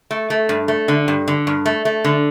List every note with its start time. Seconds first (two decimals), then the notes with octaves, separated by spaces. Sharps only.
0.11 A3
0.30 A3
0.49 G2
0.68 A3
0.88 D3
1.08 G2
1.28 D3
1.47 G2
1.66 A3
1.85 A3
2.04 D3